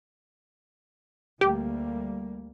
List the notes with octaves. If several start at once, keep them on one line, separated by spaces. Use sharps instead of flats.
D2 G3 A#3 G4